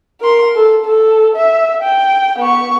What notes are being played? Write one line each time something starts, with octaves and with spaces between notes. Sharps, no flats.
A#4 C6
A4
A4
E5
G5
B3 C#6